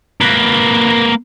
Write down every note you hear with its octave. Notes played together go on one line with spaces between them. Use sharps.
A#3 B4